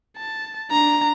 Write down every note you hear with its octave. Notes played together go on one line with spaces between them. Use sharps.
A5
D4 A#5